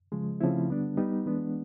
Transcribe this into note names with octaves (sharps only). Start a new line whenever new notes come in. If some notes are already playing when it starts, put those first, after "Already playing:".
C#3 F3 G#3
C#3 F3 A3 C4 E4
D3 G3 B3 D4
G3 B3 D#4
E3 G#3 B3 D4